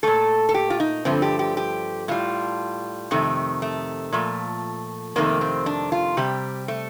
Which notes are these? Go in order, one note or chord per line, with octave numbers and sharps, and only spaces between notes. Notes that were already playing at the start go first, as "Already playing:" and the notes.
A#2 A3 A4
A4
G4
F4
D#4
G2 D3 F3 A3 C4
G4
G4
G4
A2 G3 F4
F2 C3 D#3 A3
A3
A#2 F3 A3
F2 C3 D#3 A3 A#3
C4
D4
F4
C3 G3 G4
A3